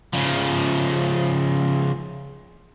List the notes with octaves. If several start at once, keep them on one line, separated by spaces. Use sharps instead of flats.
C#3 F3